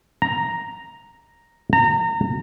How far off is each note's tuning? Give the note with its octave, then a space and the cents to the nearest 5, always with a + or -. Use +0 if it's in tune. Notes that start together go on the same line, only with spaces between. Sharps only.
A#5 +0
A#5 -30